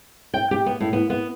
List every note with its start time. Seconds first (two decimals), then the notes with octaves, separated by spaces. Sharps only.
0.34 G5
0.51 G4
0.66 B3
0.80 A2
0.93 B3
1.10 B3